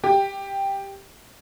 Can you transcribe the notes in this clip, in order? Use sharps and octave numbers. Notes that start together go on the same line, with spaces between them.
G4